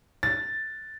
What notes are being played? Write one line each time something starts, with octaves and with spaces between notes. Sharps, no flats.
A6